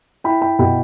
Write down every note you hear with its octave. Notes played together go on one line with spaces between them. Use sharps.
E4 G5 B5
G5 B5
B2 G5 B5